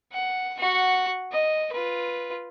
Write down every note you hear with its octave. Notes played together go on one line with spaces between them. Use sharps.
F#5
F#4 F#5
D#5
F4 B4